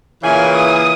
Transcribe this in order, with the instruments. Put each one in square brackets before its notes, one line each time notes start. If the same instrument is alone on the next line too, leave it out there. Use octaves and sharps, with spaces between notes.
[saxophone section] A#2 C#3 E3 [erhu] G#5
[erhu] D#6